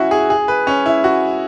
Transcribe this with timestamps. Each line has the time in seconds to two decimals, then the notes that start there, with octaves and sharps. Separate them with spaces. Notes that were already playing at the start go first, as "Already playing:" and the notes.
Already playing: C#4 E4 F#4
0.11 G#4
0.30 G#4
0.48 B4
0.67 C#4
0.86 E4
1.04 F#4